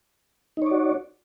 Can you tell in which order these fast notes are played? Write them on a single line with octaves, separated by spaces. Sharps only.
D#4 C#5 D5 F#4